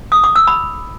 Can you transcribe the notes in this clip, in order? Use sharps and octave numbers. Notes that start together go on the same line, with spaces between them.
D#6
D6
E6
B5